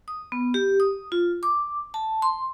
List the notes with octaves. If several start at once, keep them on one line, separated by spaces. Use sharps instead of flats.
D#6
B3
G4
D#6
F4
D6
A5
C6